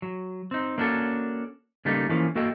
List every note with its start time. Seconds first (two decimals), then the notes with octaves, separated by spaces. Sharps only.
0.02 F#3
0.51 C4 D#4
0.78 A#3 C#4 D4 F#4 G#4 A4
1.85 C#3 G3 A3 A#3 D#4 A4
2.09 E3 F3 A3 A#3 C#4
2.35 A#3 F#4 A4 D#5 G5